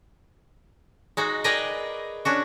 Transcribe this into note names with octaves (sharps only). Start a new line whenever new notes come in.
G#3 D#4 F#4
G#4 A#4 B4 D5 D#5 G5
C#4 D4 F#4